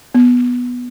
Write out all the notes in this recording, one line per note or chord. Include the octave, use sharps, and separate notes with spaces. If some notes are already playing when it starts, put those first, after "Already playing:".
B3